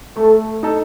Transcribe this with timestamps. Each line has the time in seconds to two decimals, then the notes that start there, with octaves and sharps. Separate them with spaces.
0.16 A3 A4
0.63 D#4 A4